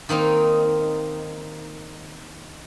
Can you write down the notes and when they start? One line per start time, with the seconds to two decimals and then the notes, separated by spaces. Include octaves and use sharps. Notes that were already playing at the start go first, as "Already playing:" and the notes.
0.09 D#3 A#3 C4 D#4